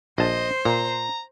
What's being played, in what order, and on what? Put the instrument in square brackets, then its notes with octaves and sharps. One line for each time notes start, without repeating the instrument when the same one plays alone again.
[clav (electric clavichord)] A#1 A5 [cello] C5 [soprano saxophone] D#5
[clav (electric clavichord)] A#2 [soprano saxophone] A#5